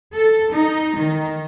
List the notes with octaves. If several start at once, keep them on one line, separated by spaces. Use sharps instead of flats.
A4
D#4
D#3